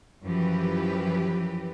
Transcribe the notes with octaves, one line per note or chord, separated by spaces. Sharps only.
F#2 E3 F3 G4 B4